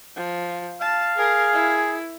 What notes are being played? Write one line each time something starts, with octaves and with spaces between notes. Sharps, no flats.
F3
F5 A5
G#4 A#4
E4